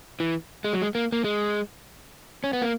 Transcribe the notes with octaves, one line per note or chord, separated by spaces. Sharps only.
E3
G#3
F#3
G#3
A#3
A#3
G#3
C#4
B3
A#3